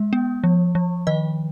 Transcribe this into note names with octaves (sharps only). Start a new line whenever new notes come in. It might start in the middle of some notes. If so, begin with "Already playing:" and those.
Already playing: G#3
B3
F3
F3
D#3 D#5